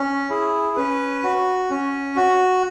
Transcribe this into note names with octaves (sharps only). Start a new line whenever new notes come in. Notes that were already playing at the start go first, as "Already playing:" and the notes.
Already playing: C#4
E4 G#4
C#4 B4
F#4
C#4
F#4